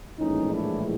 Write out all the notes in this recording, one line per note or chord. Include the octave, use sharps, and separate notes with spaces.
A#1 A2 E3 G#3 C#4 D#4
D4 E4